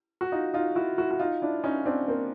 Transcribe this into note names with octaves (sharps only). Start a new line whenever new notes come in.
F#4
D#4 F4
D#4 F4
E4 F#4
E4 F#4
F#4
D#4 F4
D4 E4
C#4 D#4
C4 D4
A#3 C4